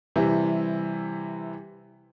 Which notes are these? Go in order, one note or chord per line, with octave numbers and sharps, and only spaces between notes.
C3 E3 G3 E4